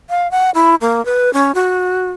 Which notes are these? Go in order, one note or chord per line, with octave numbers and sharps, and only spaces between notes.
F5
F#5
E4
A#3
B4
C#4
F#4